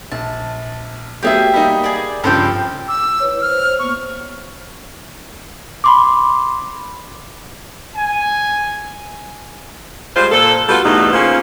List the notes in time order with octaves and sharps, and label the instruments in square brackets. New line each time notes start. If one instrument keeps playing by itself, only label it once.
[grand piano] A#1 [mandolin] A5
[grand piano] F#3 A3 B3 [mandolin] G4 G#4 E5
[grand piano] G3 A#3 D#4
[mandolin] G#4 D5
[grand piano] G2 C#3 F3 [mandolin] A4 C5 G5
[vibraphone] D6 [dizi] E6
[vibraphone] E4 B4 C#5
[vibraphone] C5 C#5 [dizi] F6
[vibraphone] A#3 B3 [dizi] C#6
[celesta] B5 C6 D6
[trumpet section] G#5
[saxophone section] G3 G#3 F4 C5
A#2 A4
G3 B3 F4 F#4 A4
E2 G2 B2 A3 D#4
C#3 A#3 C#4 F4 C5